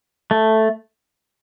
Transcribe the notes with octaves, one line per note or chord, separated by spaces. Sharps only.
A3